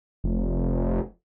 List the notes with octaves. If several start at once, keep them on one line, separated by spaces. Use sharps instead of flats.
F1